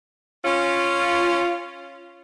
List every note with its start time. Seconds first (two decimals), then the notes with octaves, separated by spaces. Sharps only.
0.45 C#4 F4